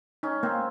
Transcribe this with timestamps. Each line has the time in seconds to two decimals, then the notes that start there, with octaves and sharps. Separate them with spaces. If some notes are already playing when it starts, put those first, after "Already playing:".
0.23 C#4 D#4
0.43 A#3 C4